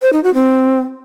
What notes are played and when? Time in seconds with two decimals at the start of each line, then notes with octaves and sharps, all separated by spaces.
0.02 C5
0.13 D#4
0.24 F#4
0.34 C4